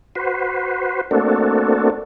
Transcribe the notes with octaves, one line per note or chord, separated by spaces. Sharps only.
F#4 B4 C5
A3 A#3 C4 D4 F#4 A4